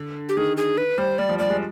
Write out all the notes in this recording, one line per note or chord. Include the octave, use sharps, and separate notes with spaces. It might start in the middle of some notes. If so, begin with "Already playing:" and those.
Already playing: D3
G4
D#3 G#4
G#4
B4
G3 C5
G3 D5
F3
G3 D5
G#3